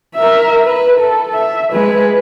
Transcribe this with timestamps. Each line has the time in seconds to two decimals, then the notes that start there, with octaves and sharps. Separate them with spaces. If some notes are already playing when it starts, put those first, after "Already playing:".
0.15 A#4 E5
0.65 B4
1.00 A4
1.33 E5
1.72 G#3 B4